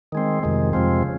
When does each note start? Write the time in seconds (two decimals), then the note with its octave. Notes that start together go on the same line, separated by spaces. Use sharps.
0.12 D#3 G#3 C4
0.43 F2 C3 D#3 G#3
0.73 F2 C3 F3 G#3 C4
1.03 C#3